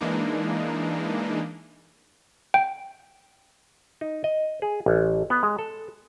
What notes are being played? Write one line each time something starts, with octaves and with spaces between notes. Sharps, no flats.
E3 G#3 A#3 D4 D#4
G5
D#4
D#5
G#4
A1
B3
G#3
A4